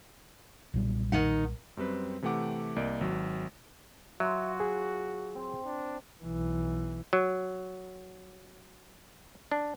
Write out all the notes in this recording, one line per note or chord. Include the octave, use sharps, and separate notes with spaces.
B1 A#2 G3
D#3 D#4 F#5
F#2 G3 C4 B4
C3 E3 A3 G4 F#5 D6
C2 A#3 D5 D#5 D7
G#1 F#3
F#3 F4 F#4 E5 G#5 C6
G#4
C4
D4
B1 E3
F#3
D4